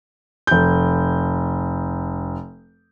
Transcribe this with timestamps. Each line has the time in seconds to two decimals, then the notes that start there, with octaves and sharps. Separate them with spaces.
0.47 F1 G6